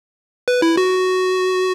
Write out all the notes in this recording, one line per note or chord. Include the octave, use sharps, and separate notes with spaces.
B4
E4
F#4